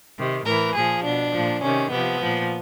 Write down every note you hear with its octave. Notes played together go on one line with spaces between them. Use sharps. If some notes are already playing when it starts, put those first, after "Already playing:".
C3 D#3
A2 E3 A#4
A#2 F3 G#4
B2 D4
A#2 F3
C3 D#3 C#4
C3 F3 B3
A#2 F3